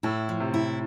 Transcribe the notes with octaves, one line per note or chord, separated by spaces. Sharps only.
A2 E4
F3
C3
E4